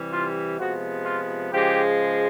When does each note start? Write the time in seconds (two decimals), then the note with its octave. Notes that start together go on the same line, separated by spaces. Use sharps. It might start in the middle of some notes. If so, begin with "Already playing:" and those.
Already playing: C3 E3 G3
0.12 F4
0.58 C3 F3 G#3 B3 F#4
1.04 F4
1.51 C#3 F3 G#3 G4